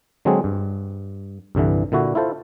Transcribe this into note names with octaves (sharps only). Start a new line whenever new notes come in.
D3 F#3 G#3 C4 D4 G#4
G2
C2 G2 D3 E3
A#2 D3 E4 F#4
E4 F4 A4 C5